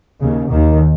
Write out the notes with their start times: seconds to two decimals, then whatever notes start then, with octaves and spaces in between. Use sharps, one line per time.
0.21 D#2 C#3
0.51 D#2 D#3